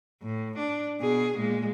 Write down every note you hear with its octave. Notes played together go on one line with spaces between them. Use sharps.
A2
D4
B2 G#4
A#2 G#3